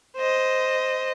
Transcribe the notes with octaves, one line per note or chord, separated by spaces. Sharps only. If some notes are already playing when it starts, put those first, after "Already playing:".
C5 D#5